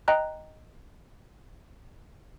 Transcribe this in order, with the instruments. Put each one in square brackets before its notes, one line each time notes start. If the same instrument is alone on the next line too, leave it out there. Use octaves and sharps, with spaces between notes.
[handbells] D#5 G5 A#5 F#6